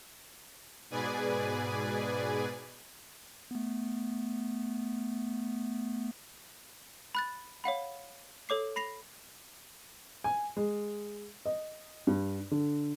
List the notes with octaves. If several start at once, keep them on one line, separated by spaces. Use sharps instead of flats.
G#2 B2 G#4 B4 D5 G#5
A3 B3
B5 F#6 A6
C#5 F5 F#5 B5
A4 C#5 D6 C7
B5 A#6 C7 F7
G#5
G#3
D#5
G2
D3